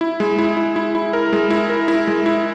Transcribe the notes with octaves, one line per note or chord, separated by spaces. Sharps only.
E4
G#3
E4
E4
E4
E4
A#4
G#3
E4
A#4
E4
G#3
E4